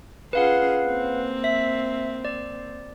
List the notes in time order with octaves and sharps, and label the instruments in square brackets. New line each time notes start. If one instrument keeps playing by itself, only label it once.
[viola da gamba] C#4 F4 G#4 [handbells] B4 F5 F#5
[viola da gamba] A#3 C4
[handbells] E5 B6
D5